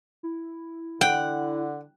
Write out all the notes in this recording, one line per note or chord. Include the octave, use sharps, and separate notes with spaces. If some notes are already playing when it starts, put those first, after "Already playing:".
E4
D3 F#5 G5